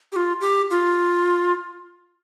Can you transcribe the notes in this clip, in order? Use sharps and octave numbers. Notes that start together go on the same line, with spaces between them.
G4
F4
G4
F4